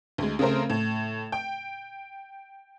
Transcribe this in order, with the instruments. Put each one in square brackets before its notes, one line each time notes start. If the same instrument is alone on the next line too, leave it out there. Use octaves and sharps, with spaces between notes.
[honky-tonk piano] D2 G#3
C#3 A3 C4 A#4 C5
A2
G5